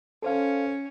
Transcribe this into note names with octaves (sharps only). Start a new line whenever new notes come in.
C#4 A4 C5 F5